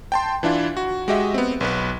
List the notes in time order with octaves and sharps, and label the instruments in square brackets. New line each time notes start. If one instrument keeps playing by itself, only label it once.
[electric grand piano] G5 A5 C6
E3 D4 E4 F4
F#4
G#3 F#4 G4 D#5 E5
B3 C4
B1 B3 B4